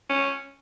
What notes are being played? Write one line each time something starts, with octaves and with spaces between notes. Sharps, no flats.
C#4